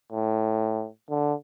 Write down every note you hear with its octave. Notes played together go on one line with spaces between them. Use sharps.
A2
D3